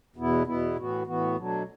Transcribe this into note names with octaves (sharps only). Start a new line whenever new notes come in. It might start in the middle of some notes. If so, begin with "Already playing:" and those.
E2 B2 B3 E4
E2 B2 B3 E4
A2 E3 B3 F#4
A2 E3 B3 F#4
B2 F#3 A3 D4